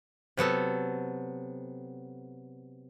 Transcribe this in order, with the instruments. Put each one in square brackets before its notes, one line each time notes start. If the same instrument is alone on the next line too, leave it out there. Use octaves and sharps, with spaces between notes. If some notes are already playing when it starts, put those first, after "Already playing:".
[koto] C3 F#3 B3 A4